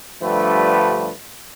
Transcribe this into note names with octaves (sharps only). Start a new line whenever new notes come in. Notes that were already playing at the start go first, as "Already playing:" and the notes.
G2 D3 F3 G3 A3 B4